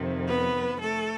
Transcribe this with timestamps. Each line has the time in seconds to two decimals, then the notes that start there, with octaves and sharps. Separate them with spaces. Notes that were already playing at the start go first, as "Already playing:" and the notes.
Already playing: F2 C3 D#3
0.27 B3 B4
0.80 A3 A4